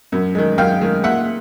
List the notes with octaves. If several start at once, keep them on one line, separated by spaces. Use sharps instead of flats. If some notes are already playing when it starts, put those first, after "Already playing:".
F#2
D#3 G#3
F#2 F5 G5
D#3 G#3
A#2 E5 F#5